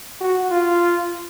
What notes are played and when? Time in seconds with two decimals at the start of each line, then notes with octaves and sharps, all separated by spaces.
0.21 F#4
0.51 F4